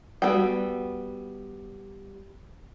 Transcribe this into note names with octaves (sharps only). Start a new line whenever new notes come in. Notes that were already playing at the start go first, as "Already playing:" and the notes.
G3 B3 F#4 A4 G5